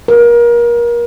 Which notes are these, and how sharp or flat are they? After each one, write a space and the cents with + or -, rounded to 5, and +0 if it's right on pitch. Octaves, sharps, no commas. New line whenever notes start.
A#4 +30